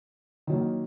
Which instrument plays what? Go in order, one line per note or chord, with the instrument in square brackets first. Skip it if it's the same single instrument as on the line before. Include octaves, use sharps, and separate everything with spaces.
[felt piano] D#3 F#3 A#3